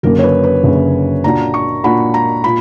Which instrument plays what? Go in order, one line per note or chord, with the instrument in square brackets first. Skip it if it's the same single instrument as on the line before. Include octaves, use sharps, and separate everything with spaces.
[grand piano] F#1 F#2 D3 A#3 C#4 [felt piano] A#4
[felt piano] C#5
B4
B4
[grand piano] F#1 F#2 D3 A#3 C#4
[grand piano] A#2 A#3 D4 F#4 [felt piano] A#5
[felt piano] C#6
[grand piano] A#2 A#3 D4 F#4 [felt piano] B5
[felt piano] A#5
[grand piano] A#2 [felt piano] B5